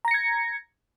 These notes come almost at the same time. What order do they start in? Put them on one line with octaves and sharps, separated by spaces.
A#5 A#6 C#7 G#6